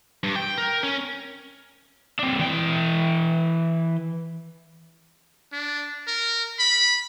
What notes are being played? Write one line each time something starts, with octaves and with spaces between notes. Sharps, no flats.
G2
G5
A#4
C#4
C4 D4
E3 G5
D4
A#4
B5